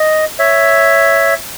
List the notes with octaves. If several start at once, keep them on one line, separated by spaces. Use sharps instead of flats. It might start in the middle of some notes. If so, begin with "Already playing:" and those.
Already playing: D#5
C#5 E5